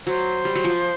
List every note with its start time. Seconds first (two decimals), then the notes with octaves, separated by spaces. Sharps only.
0.07 F#3 C5
0.45 G3
0.55 F#3
0.64 F3